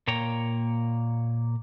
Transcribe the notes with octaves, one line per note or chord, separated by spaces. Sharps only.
A#2 A#3 C#5 G5 A#5